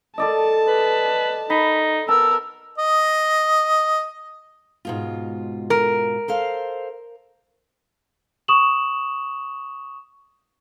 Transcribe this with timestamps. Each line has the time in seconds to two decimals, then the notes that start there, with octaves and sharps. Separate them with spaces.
0.18 A4 D5 D#5 A5
0.67 B4
1.50 D#4 B5
2.08 B3 A#4 A5 E6
2.78 D#5
4.85 G#2 B2 F4
5.70 A#4
6.28 A4 C5 F5
8.48 C#6 D#6 E7 F#7